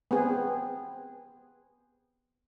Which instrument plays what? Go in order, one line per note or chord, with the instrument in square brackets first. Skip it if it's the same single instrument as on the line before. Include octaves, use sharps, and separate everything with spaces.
[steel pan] B3 C4 G#4